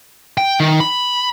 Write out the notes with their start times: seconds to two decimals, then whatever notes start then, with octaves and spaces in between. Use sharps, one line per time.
0.38 G5
0.60 D#3
0.80 B5